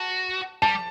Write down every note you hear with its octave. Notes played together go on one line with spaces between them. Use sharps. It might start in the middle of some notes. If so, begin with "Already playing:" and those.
Already playing: F#4 A5
G3 A5